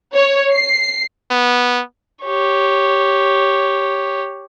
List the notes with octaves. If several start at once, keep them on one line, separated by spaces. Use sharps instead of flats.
C#5
C7
B3
G4 C#5